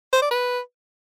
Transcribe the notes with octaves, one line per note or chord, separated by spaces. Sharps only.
C5
D5
B4